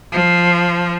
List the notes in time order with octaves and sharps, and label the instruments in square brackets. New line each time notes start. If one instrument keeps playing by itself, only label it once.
[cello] F3